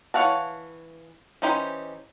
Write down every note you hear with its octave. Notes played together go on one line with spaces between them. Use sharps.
E3 C#5 F5 F#5 A5
E3 C#4 D#4 G4 C5